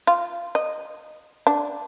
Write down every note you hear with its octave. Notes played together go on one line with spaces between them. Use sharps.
F4
D#5
D4